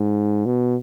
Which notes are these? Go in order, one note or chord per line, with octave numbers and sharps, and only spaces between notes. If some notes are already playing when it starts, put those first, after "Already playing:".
Already playing: G#2
B2